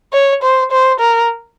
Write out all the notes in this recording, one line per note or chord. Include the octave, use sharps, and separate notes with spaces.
C#5
C5
C5
A#4